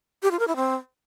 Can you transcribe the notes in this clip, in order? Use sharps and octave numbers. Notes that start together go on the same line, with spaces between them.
G4
F4
A#4
E4
C4